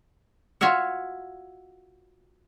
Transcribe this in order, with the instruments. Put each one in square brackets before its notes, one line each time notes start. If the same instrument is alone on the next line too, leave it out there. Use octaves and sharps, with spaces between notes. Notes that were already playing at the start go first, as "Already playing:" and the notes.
[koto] F4 F#4 C#5 E5 F#5